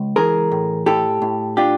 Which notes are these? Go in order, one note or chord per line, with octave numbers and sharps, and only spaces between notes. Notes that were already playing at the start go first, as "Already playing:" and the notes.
Already playing: C#2
E3 G#4 A#4
A2
A2 G4 A4
A2
D4 F4 G4